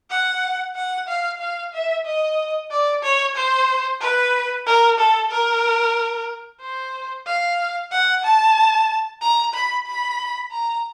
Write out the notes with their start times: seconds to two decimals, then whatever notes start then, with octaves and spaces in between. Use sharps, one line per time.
0.10 F#5
0.76 F#5
1.08 F5
1.41 F5
1.74 E5
2.05 D#5
2.71 D5
3.03 C#5
3.36 C5
4.01 B4
4.66 A#4
4.99 A4
5.31 A#4
6.61 C5
7.26 F5
7.92 F#5
8.24 A5
9.22 A#5
9.54 B5
9.87 B5
10.52 A#5